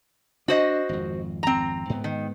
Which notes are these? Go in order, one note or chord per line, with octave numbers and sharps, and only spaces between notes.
D4 F#4 C5 D#5
G#1 F2
C4 A#5
G#2 B3
D#3